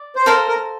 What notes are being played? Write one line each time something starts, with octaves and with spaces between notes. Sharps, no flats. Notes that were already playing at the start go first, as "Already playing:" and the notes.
Already playing: D5
C5
A4 A#4 C5 F5 A#5
A#4